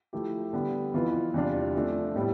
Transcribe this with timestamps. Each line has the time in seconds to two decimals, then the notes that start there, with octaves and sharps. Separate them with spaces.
0.13 F3 A3 E4 G4
0.53 D3 G3 B3
0.94 F2 E3 B3 F4 B4
1.34 E2 C3 G3 D4 F4
1.75 F3 A3 D4
2.16 A2 G3 B3